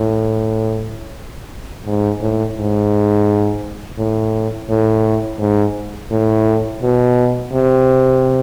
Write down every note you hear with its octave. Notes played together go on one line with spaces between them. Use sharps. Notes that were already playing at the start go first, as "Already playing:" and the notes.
Already playing: A2
G#2
A2
G#2
A2
A2
G#2
A2
B2
C3